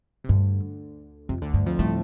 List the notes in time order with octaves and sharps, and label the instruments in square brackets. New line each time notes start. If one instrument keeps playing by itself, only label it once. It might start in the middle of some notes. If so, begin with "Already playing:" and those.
[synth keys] C3
[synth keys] D2 D3 [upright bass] G2
[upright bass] F2 [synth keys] C3
[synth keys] D2 D3
[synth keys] D2 D3 [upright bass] G2
[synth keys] F2 F3
[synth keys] A2 A3 [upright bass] G3